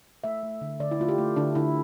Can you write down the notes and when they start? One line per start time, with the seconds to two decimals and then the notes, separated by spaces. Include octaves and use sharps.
0.24 A3 E5
0.43 A3
0.61 D3
0.80 D3 D5
0.91 E4
1.00 A3 F4
1.08 G4
1.18 A3
1.36 D3 D4
1.55 D3 E4